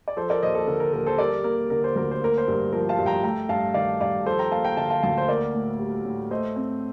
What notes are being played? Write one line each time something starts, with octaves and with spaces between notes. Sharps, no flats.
D5
F3 A4 C5
A#4 D5
D#2 C5 D#5
A4
D3 A#4
A#4
D#2 A#4
A4 C5
G3 A#4 D5
A#3 A#4
D3 A#4
C5
D2 A#4
C5
A#3 A#4
C5
G2 A#4
F3 A#4
F5 A5
G2
G5 A#5
A3 G5 A#5
G2 F5 A5
D#3 D5 F5
G2 D5 F5
F3 A4 C5
G5 A#5
A#3 F5 A5
G5 A#5
D3 F5 A5
F5 A5
D2 F5 A5
C5
A#3 A#4 D5
A2
G3
A2
A3 C5 D#5
C4